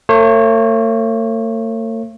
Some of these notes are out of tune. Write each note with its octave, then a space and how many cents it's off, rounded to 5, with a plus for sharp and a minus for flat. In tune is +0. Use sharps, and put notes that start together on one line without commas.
A3 +45 C#5 -35